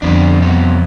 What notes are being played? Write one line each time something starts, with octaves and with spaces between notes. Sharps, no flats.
F2 D3 G3 B3 D4
C3 G3 B3